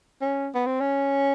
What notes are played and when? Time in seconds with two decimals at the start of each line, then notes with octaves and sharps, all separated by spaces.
0.22 C#4
0.55 B3
0.66 C4
0.81 C#4